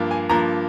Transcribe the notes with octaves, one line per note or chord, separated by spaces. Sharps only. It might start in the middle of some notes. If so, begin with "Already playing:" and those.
Already playing: G2 F3 A#3
G#5
G2 F3 A#3 A#5